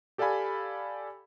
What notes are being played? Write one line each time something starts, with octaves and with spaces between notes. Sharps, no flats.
G4 A4 D5 F5 G#5 B5